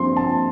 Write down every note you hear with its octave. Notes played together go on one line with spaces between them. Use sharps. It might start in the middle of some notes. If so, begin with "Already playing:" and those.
Already playing: G2 F3 C4 C6
A5